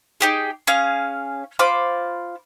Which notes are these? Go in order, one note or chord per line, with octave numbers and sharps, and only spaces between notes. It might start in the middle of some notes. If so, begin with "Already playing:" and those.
D#4 G4 G#4
C#4 G#4 F5
F4 C5 B5 D6